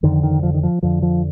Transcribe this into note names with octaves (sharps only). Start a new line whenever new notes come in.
F2 D3 D#3
D#3
F3
D#3
F3
F2 D3 F3
F3